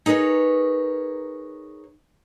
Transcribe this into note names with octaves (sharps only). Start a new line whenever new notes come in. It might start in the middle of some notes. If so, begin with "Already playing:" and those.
D#4 G#4 A#4 B4 C#5